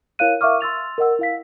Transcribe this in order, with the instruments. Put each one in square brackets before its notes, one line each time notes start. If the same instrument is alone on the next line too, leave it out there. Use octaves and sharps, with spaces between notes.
[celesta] E4 A#4 C#5 F5 F#6 D#7
A#4 E5 F5 C#6 D6 F6
C6 E6 A6 F7
A#4 D#5 F#5 E6
E4 F5 B6